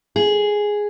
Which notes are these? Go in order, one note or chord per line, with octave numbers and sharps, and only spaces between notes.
G#4